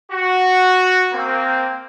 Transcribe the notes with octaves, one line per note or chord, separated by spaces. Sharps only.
F#4
A#3 C4